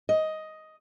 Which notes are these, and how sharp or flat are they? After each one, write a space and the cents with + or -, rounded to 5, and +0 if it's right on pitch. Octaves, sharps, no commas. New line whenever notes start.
D#5 +10